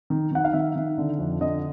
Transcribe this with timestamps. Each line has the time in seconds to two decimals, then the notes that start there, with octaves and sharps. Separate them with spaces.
0.10 D#3
0.32 D#3 F#5
0.45 F5
0.53 D#3 E5
0.76 D#3
0.98 D3
1.19 F2
1.40 D3 D#5